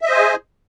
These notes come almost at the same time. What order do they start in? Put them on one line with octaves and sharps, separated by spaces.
E5 D#5 C5 G#5 G#4